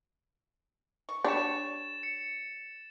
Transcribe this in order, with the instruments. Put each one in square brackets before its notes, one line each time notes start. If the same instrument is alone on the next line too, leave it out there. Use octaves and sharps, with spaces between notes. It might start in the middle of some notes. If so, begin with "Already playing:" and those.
[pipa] C#6
[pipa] G3 C#5 [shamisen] D4 [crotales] A6 E7
[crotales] C#7